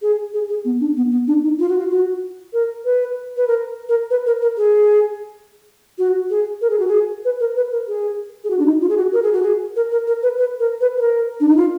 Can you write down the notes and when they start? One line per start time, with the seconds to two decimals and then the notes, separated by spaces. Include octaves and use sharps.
0.02 G#4
0.34 G#4
0.49 G#4
0.65 B3
0.81 D4
0.97 B3
1.12 B3
1.27 D4
1.43 D#4
1.59 F4
1.69 F#4
1.79 F4
1.91 F#4
2.53 A#4
2.85 B4
3.37 B4
3.48 A#4
3.89 A#4
4.11 B4
4.26 A#4
4.42 A#4
4.57 G#4
5.98 F#4
6.30 G#4
6.62 A#4
6.70 G#4
6.79 F#4
6.88 G#4
7.25 B4
7.40 A#4
7.56 B4
7.72 A#4
7.88 G#4
8.44 G#4
8.50 F#4
8.59 D4
8.66 D#4
8.81 F4
8.89 G#4
8.97 F#4
9.13 A#4
9.23 G#4
9.33 F#4
9.43 G#4
9.76 A#4
9.92 A#4
10.07 A#4
10.23 B4
10.38 B4
10.60 A#4
10.81 B4
10.97 B4
11.01 A#4
11.40 D4
11.48 D#4
11.57 F4